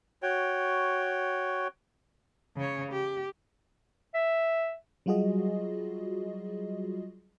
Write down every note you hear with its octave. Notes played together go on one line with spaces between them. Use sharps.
F#4 C#5 G5
C#3 C#5
G4
E5
F#3 G3 F4 F#4 G#4 D#5